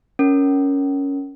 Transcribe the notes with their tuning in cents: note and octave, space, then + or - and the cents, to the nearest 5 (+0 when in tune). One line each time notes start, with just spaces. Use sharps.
C#4 +5 A#4 +0